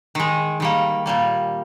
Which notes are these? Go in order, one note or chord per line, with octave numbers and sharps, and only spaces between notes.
D#3 G#3
D#3 G3 A#3
A#2 G3 A#3